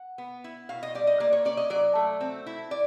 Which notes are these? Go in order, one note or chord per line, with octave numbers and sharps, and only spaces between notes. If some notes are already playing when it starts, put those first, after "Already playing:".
Already playing: F#5
B3
E4
B2 F5
D#5
G3 D5
D#5
A#3 D5
C#5
C#4 D5
D#5
F#3 D5
A3
C4
E4
D5